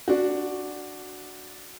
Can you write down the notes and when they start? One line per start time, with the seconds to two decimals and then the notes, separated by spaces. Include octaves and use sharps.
0.08 D4 F#4